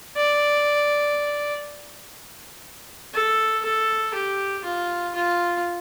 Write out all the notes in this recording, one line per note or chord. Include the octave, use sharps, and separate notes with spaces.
D5
A4
A4
G4
F4
F4